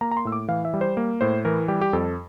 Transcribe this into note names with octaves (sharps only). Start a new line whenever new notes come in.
A#3 A#5
A#5
C6
A2 E6
D6
E3 F5
E5
G3
C5
A#3
A2 C5
E3 A#4
G3 G4
G4
F2 A4